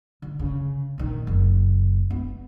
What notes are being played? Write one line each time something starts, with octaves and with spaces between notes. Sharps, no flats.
D3
C#3
A#2 D#3
F#1
B3